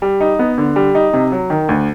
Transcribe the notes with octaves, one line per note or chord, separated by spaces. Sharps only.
G3
D#4
B3
D3
G3
D#4
C3
F#3
D#3
D2